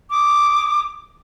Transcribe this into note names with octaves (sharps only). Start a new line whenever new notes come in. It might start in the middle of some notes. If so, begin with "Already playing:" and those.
D6 D#6